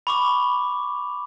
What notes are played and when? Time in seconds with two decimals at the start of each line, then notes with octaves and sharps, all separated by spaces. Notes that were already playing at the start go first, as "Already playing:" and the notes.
0.07 B5 C#6 D6